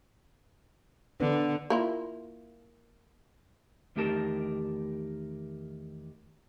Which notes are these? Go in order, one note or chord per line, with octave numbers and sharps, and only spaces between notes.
D3 B3 D4 B4
A#3 E4 F4
E2 D#3 A3 G4 A#4 A5